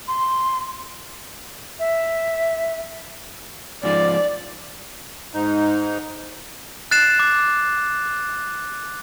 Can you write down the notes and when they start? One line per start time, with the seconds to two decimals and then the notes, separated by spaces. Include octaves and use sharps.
0.08 C6
1.79 E5
3.83 G#2 F3 D5
5.34 G#2 D#4
6.91 F#6 A6 C7 E7
7.19 D6